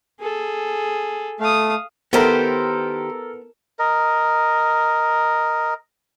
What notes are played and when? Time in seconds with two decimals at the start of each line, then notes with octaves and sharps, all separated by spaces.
0.20 G#4 A4
1.40 A3 F5 D#6
2.13 D#3 B3 E4 G4 A4 A#4 C5
3.79 A#4 D#5